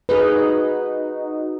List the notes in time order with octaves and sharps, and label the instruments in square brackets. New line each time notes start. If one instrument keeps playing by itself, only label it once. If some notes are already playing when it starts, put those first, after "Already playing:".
[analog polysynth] D#4 F#4 [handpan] G#4 B4